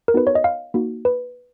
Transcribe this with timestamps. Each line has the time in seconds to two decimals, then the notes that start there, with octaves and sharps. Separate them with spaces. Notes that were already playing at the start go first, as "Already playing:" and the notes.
0.08 A#4
0.14 B3 D#4 F#4 B4
0.27 C#5
0.35 D#5
0.44 F5
0.74 A#3 D#4 F#4
1.05 B4